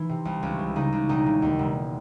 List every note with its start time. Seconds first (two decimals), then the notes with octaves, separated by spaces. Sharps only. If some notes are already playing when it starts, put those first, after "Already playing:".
Already playing: E3 D#4
0.09 C3
0.25 C2
0.43 C#2 C#4
0.59 E3
0.76 C#3 D#4
0.93 C#2
1.09 E1 D#4
1.26 C#3
1.42 D#2
1.59 E1